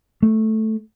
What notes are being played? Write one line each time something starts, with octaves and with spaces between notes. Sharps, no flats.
A3